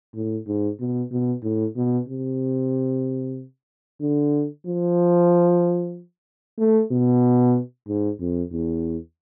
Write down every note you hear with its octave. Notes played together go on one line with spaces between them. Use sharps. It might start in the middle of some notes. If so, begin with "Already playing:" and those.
A2
G#2
B2
B2
A2
B2
C3
D3
F3
A3
B2
G#2
F2
E2